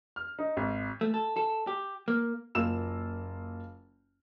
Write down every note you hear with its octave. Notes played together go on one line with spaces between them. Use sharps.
F6
D#4
G#1
A3
A4
A4
G4
A#3
F#1 A#3 F4 E6 E7